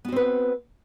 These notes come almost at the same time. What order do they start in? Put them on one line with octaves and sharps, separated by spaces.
B3 F#4 C4 B4